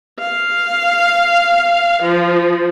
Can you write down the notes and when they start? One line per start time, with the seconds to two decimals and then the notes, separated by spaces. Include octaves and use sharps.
0.19 F5
2.02 F3